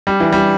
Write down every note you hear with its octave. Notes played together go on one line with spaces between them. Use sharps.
G3
E3
G3